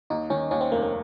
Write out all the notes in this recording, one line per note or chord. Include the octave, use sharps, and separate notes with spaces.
D#2 D#4
D#3 C#4
D#2 C#4
C4
F1 A#3
A#3